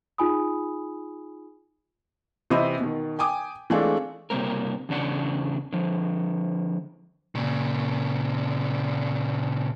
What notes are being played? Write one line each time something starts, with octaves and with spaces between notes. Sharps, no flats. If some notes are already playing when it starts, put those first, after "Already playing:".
D#4 F4 G#4 G#5 B5 D#6
C3 E3 C5 D#5 E5 B5
B2 D#3
G5 G#5 D6 D#6
E3 G#3 A3 C4 D4 F4
C3 G3 A#3 C4 A#4
E2 C#3 D4 F#5
D3 F3
A#2 C#3